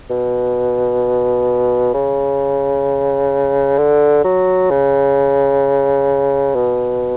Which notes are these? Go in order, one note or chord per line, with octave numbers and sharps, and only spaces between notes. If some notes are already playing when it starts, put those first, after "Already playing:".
B2
C#3
D3
F#3
C#3
B2